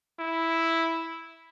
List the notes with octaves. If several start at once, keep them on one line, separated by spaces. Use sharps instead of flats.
E4